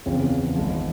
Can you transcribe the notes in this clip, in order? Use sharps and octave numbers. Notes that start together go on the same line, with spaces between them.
E2 C#3 F3 C4 F4
G#1 G#2 F3